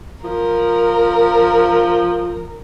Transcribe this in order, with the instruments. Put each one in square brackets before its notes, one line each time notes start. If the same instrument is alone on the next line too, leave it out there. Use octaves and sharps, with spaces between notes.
[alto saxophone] F3 [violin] A#4